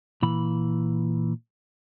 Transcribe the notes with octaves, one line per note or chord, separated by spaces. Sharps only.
A#2 E3 B5